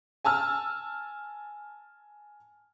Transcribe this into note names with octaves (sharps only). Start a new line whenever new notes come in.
G#5 A5 E6 F6